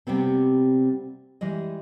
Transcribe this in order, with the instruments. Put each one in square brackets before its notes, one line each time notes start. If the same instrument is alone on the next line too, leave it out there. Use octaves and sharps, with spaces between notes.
[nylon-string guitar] C3 G3 B3 C4
E3 G3 G#3 D#5